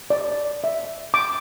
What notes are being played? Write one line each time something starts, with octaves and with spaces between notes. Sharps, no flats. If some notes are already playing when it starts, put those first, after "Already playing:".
D5
E5
D6